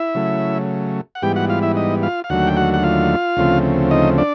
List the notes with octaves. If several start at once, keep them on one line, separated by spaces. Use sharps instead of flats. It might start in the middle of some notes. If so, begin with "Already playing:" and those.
Already playing: E4 E5
C#3 F#3 A3
F#5
G#2 E3 G3 B3 G4 G5
F#4 F#5
F4 F5
E4 E5
D#4 D#5
F4 F5
F5
D#2 D3 F#3 A3 F#4 F#5
G5
F#4 F#5
F#5
F4 F5
D2 C#3 F3 A3 C4
D#4 D#5
D4 D5